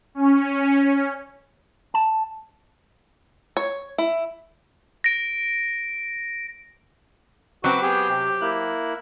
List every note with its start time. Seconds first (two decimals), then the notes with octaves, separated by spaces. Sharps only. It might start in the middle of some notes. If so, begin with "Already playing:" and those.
0.15 C#4
1.94 A5
3.57 C#5
3.98 E4
5.04 A#6 D7
7.64 F#3 C4 F#4 B4 D6
7.83 B3 G4 G#4 G5
8.09 C3
8.41 A#3 E4 F#6